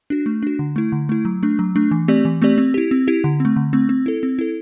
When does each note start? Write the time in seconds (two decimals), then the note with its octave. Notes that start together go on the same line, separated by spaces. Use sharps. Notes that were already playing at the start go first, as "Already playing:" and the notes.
0.10 D4 F#4
0.26 A3
0.43 D4 F#4
0.59 D3
0.76 A3 E4
0.92 D3
1.09 A3 E4
1.25 F#3
1.43 A3 D4
1.59 F#3
1.76 A3 D4
1.91 E3
2.08 A3 C4 G4 D5
2.25 E3
2.42 A3 C4 G4 D5
2.58 C4
2.74 E4 G4
2.91 C4
3.07 E4 G4
3.24 D3
3.40 A3 C4
3.56 D3
3.73 A3 C4
3.89 C4
4.06 E4 A4
4.23 C4
4.39 E4 A4